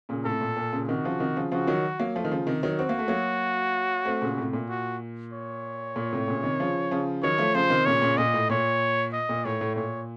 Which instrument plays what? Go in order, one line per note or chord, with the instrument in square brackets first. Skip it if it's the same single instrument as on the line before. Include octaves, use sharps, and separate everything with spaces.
[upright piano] A#2 C#3
[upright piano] A2 C3 [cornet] A4
[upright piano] A#2
A#2
A#2 C#3
[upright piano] C3 D#3 [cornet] F#4
[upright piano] C#3 F3
C3 D#3
C#3 F3
[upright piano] C#3 F3 [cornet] F#4
[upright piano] D#3 F#3
F#3 A#3
F3 A3
D#3
C#3 F3
C3 D#3
D#3 F#3
[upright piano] C4 [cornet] F#4
[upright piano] A#3
A3
F#3 A#3
A3 C4
A#2 C#3
A2 C3
A#2
[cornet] F#4
C#5
[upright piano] A#2
A2 C3
A#2 C#3
C3 D#3
C#3 F3
C#3 F3
[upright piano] D#3 F#3 [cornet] C#5
[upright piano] F3 A3
[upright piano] C#3 F3 [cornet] C5
[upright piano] C3 D#3
[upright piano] A#2 C#3 [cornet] C#5
[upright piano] A#2 C#3
[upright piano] A#2 [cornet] D#5
[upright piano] A2
[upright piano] A#2 [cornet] C#5
[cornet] D#5
[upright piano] A#2
[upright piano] A2 [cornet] C#5
[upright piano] A2
[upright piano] A#2 [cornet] C#5